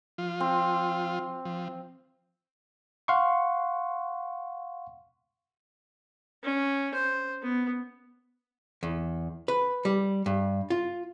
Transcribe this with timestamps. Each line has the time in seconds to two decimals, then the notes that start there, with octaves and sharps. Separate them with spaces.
0.18 F3 F4
0.40 C4
1.45 F3
3.08 F5 F#5 C6 C#6
6.44 C#4
6.94 C5
7.42 B3
8.83 E2
9.48 B4
9.85 G3
10.26 G2
10.70 F4